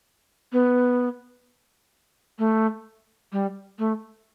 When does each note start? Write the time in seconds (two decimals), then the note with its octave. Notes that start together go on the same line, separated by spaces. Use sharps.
0.52 B3
2.39 A3
3.32 G3
3.79 A3